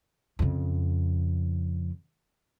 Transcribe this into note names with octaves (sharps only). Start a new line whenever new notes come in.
F2 C#3